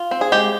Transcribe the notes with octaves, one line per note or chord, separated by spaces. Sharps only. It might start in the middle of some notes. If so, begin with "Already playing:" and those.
Already playing: F4
C4
G#4
G#3 G4